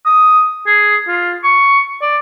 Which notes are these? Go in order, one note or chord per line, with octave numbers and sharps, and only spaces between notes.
D#6
G#4
F4
C#6
D5